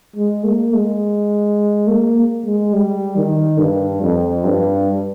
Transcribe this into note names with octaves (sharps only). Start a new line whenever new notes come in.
G#3
A#3
G#3
A#3
G#3
G3
D#3
G2
F2
G2